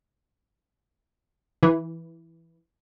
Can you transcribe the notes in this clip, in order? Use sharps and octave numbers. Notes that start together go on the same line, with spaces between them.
E3